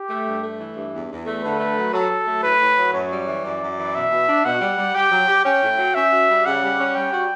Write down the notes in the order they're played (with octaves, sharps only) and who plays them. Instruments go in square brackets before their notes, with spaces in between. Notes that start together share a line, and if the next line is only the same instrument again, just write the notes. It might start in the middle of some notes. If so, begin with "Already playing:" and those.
Already playing: [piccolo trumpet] G4
[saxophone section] A3
G2
A3
E3
G2
E2
E2
A3
[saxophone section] D3 [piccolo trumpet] B4
[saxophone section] A3
F#3
[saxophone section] F#3 [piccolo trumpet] A4
[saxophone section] F#3
A3
[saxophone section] A2 [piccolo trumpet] B4
[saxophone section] A2
F#3
[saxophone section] F#2 [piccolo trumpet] C#5
[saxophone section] G3
E3
[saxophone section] F#2 [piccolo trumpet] D5
[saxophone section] F#2
E3
[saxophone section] B2 [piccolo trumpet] E5
[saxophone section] B2
D4
[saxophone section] B2 [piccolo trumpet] F#5
[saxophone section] G3
G3
[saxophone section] G4 [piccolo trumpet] G5
[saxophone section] F#3
G4
[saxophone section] C#4 [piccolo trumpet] G5
[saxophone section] A2
F#3
[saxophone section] C#4 [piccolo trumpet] E5
[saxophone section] F#4
G3
[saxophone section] C#3 [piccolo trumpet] F#5
[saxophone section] G3
C#4
[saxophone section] G3 [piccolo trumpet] G5
[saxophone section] F#4